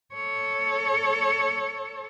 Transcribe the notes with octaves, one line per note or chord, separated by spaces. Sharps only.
A4 C#5